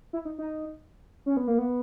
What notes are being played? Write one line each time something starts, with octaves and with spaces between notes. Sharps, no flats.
E4
D#4
D#4
C#4
B3
A#3
B3